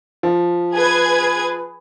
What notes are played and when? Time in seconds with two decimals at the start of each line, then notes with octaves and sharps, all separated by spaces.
0.23 F3
0.74 G#4 B4 G#6